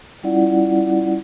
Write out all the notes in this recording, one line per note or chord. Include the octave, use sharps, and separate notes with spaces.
G3 C#4 E4 F4 D5 F#5